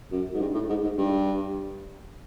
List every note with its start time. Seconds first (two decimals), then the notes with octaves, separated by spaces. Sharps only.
0.12 F#2
0.34 G#2
0.40 G2
0.54 A2
0.69 G#2
0.83 G#2
0.98 G2